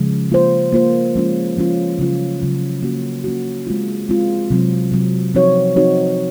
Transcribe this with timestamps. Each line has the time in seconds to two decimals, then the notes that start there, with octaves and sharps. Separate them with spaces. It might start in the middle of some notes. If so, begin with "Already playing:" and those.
Already playing: C#3 F3 G#3
0.31 A#3 F4 C5
0.72 A#3 F4 C5
1.15 F3 G#3 C#4 F4
1.57 F3 G#3 C#4 F4
1.99 C#3 F#3 C#4 F4
2.40 C#3 F#3 C#4 F4
2.82 A#3 C#4 F#4
3.24 A#3 C#4 F#4
3.67 G#3 C4 F4
4.09 G#3 C4 F4
4.50 C3 F#3 C4
4.92 C3 F#3 C4
5.35 F3 C4 D#4 F#4 C#5
5.76 F3 C4 D#4 F#4 C#5